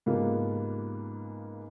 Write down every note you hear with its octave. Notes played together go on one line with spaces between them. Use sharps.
G#2 C#3 A#3 B3 F4 G4